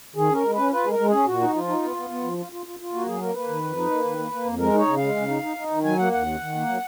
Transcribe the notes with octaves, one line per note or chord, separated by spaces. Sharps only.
D#3 G#4
C#4 A#4
G#3
B4
C#4
F4 B4
G#3 G#4
A#4
G#3
C#4 G#4
A#2 F#4
D#4
F3 F4
D#4
B3
B3
B3
F3
F4
F4
F4
F4
A#3 F#4
F#3 G#4
A#3 A#4
A#3 B4
D#3
F2
D#4
A#3
D#3
A#3
A#3
F2
G#3 A#4
D#4 C#5
C#3
G#3 F5
C#3
D#4
D#4
D#4
D#3
F#3 G#5
A#3 F#5
D#2 F#5
D#3
D#3
A#3
F#3